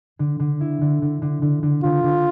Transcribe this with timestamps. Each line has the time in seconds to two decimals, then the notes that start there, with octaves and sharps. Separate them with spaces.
0.19 D3
0.40 D3
0.61 E4
0.81 D3
1.02 D3
1.22 D3
1.42 D3
1.63 D3
1.84 D3 F4
2.04 D3